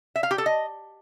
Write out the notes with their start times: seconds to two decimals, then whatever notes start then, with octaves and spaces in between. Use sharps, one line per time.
0.16 E5
0.23 F5
0.31 G4
0.38 A4
0.46 D#5